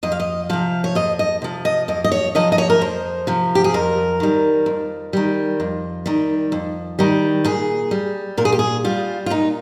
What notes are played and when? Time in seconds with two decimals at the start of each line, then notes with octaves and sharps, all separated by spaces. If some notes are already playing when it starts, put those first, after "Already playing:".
0.03 F2 D#5
0.12 F5
0.20 D#5
0.49 C3 F3 F5
0.84 C#5
0.95 F2 D#5
1.19 D#5
1.42 C3 F3
1.65 D#5
1.88 F2 D#5
2.04 D#5
2.12 C#5
2.35 C3 F3 D#5
2.52 D#5
2.58 C#5
2.70 A#4
2.81 F2 C5
3.27 C3 F3
3.55 G4
3.64 G#4
3.74 F2 A#4
4.20 D#3 G3
4.66 F2
5.13 D#3 G3
5.60 F2
6.06 D#3 G3
6.52 F2
6.99 D#3 G3
7.44 A#2 G#4
7.91 G3
8.37 A#2 A#4
8.45 G#4
8.52 G4
8.59 G#4
8.84 G3 F4
9.26 F4
9.30 A#2 D#4